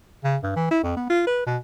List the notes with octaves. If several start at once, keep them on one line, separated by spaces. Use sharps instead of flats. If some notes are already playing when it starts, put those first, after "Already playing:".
C#3
G2
E3
E4
F2
B3
F4
B4
B2